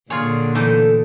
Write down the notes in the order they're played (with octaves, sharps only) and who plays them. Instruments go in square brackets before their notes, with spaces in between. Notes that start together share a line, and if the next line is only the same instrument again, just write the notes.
[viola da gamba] A#2 D3 [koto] F4 C#5 [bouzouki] G#4
[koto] E3 A3 D#4 [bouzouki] A4